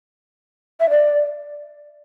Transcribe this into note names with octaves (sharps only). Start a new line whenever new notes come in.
E5
D5